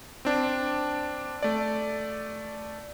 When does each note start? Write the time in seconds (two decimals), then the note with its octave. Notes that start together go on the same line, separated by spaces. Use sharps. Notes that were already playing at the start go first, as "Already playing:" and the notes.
0.25 C4 D4
1.43 A3 D5